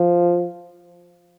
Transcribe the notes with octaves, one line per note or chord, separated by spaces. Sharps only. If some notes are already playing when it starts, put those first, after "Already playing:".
Already playing: F3